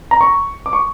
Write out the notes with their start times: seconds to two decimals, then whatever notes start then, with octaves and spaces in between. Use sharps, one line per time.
0.11 A#5
0.21 C#6
0.66 D6
0.73 C#6